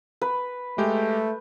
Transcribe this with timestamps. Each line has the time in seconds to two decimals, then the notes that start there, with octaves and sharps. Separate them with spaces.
0.21 B4
0.78 G#3 A3 G4 G6